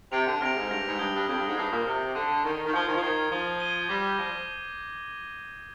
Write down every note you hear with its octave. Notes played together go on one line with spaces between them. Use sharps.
C3 G6 D7 F7
D3
C3 F6 A#6 D7 F7
G#2
G2 F6 A#6 D7 F7
G#2
G2 D#6 G6 D7 G7
G2
F2 D#6 G6 D7 G7
G2
G#2
G2 F6 C7 F7
A#2
C3 F6 C7 F7
D3 G6 A#6 D#7 G7
D#3 G6 A#6 D#7 G7
D#3
F3 G#6 C7 G7
D#3
F3
D#3 G#6 C7 G7
F3 G#6 D#7 G7
G#6 D#7 G7
G3 D6 G6 A#6
F3 A#6